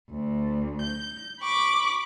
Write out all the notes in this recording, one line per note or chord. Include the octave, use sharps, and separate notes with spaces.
D2
G6
B5 C#6 D6